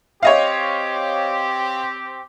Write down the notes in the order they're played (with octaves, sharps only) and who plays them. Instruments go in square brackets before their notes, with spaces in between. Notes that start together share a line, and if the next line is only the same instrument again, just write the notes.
[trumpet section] C4 G4 [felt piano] C#5 D#5 F5